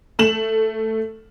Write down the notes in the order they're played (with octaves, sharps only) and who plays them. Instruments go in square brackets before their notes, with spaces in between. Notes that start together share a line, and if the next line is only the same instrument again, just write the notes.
[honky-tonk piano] A3 E7 F#7